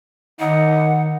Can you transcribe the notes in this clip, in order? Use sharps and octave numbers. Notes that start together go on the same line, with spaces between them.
D#3 D#4 F#5